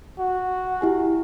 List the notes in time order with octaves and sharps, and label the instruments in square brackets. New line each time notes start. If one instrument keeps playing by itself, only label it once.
[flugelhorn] F#4
[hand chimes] E4 G4 G#5